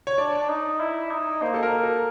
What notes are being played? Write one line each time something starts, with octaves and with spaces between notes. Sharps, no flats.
C#5
D4 D5
D4
D#4
E4
D#4
A#3 C5
A4
A#4
A4